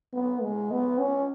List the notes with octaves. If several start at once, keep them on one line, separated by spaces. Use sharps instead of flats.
B3
G#3
B3
C#4